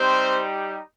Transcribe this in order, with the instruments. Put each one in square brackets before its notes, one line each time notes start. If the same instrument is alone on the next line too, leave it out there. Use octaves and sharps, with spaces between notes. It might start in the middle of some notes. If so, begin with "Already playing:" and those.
Already playing: [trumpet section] G3 C4 D#4 G4 C5